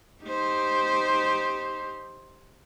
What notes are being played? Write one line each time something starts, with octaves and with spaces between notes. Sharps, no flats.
D#4 G4 C5